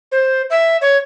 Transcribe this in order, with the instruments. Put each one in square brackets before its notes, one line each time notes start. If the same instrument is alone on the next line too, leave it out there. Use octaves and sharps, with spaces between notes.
[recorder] C5
E5
C#5